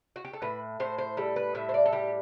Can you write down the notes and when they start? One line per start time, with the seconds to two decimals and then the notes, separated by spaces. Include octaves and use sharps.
0.16 F#4
0.25 G4
0.33 A4
0.42 A2 B4
0.80 A2 C5
0.98 C5
1.17 G3 A4
1.36 B4
1.55 A2 E5
1.69 C5
1.74 D5
1.86 A4
1.92 G3 G4